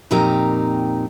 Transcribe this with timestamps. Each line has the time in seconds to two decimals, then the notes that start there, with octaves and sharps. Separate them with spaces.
0.11 F2 A#2 C4 D#4 G4 A#4